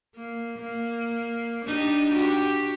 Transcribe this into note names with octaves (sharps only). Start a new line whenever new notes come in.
A#3
A#3
D4 D#4 G4
F#4 G4